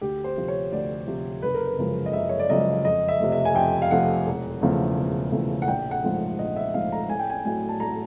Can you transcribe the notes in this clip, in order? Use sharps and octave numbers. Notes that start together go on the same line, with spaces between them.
D2 G4
C5
C3 F3
C#5
D2 D5
C3 F3
F#1 B4
A#4
B4
F#2 C#3 F3 G#3
D#5
F#1 E5
C#5
D5
F#2 C#3 F3 G#3 D#5
F2 D#5
E5
C3 F3 A3
E5
G#5
F2 G5
F5
C3 F3 A3 F#5
E1
E2 C#3 F3 A3
E1
E2 C#3 F3 A3
F#5
A#1 G5
F#5
G#2 F3 A3
A#1 D#5
E5
G#2 F3 A3 F5
A#5
A1 G#5
G5
G#5
A2 F#3 A3 G#5
A5
A1 A#5